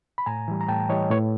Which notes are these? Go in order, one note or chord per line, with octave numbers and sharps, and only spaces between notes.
B5
A2 G#5 A#5
E3 G3
A#5
A2 G5 A5
E3 G3 C#5 D#5
A2 B4 C#5